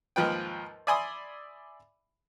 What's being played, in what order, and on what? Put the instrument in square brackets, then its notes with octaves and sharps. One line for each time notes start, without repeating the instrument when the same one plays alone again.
[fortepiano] D#2 G#2 F3 F4 B4 G5
D5 E5 G#5 B5 C6 D#6